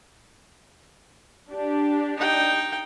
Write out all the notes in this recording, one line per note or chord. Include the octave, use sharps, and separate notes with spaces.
D4 G4
D#4 G5